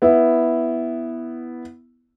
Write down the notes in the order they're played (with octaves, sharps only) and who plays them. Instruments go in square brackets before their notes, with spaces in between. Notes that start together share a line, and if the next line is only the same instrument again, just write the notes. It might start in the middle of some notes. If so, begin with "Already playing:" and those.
[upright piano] B3 E4